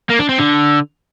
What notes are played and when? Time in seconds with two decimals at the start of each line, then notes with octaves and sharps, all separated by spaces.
0.10 A#3
0.19 D4
0.29 C4
0.38 D3